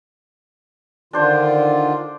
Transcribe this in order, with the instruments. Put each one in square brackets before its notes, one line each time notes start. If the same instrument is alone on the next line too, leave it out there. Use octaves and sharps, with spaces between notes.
[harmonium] D3 D#3 F4 [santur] D4 C5 D5